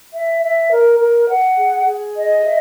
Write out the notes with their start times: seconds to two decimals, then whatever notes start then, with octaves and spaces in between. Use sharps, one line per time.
0.12 E5
0.42 E5
0.70 A#4
0.99 A#4
1.28 F#5
1.57 G#4
1.86 G#4
2.16 D#5
2.45 E5